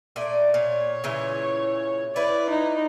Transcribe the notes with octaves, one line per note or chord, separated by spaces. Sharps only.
A#2 A3 D5
A#2 C#5
A#2 C#3 E3
E4 B4 D5
D#4